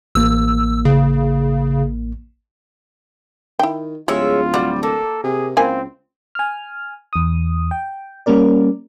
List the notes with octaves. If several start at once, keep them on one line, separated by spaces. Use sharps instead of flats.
A1 A#3 E6
C#3
D#3 E4 G5
D1 G3 G#3 F4 C#5 E5
G3 F#4 F#5
A#3 A4
C3 G#4
C#2 A#3 C4 E4 G#5
G#5 F6
E2 D#6
G5
G3 A#3 C#4 A#4 D5